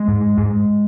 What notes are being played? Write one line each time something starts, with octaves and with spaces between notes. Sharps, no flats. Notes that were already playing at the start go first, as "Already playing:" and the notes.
Already playing: G#3
G#2
G#2